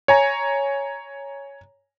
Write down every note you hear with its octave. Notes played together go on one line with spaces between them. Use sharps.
C#5 G#5 A#5